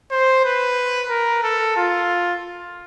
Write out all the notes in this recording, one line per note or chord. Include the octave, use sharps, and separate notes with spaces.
C5
B4
A#4
A4
F4